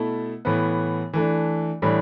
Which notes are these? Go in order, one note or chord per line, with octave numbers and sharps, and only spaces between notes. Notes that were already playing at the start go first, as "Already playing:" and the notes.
Already playing: B2 A3 E4
A2 E3 B3
E3 A3 D4
A2 E3 G3 D4